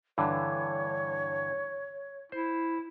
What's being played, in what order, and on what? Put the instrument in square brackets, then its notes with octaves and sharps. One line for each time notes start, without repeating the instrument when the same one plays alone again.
[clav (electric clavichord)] G2 D3 E3 [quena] C#5
[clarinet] E4 [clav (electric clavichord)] C5